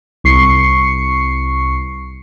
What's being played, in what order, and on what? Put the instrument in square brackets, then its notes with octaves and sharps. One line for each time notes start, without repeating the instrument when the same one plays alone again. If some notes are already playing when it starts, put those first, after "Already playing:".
[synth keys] C2 C#6 C7 C#7